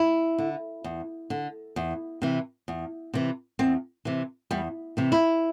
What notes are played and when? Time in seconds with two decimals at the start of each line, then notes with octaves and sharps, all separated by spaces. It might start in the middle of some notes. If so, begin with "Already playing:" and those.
Already playing: E4
0.38 D3
0.84 E2
1.30 D3
1.76 E2
2.22 C3 E3
2.68 E2
3.14 C3 E3
3.59 E2 C4
4.05 C3 E3
4.51 E2 G3
4.97 C3 E3
5.12 E4